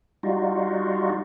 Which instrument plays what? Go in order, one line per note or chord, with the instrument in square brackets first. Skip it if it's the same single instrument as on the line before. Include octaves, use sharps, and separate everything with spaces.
[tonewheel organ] G3 D#4 F4 F#4